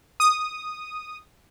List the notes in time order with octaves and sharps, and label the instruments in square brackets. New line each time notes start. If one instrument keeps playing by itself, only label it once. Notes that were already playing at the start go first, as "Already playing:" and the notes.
[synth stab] D#6